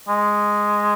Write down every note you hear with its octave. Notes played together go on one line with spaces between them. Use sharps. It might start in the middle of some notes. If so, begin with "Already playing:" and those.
G#3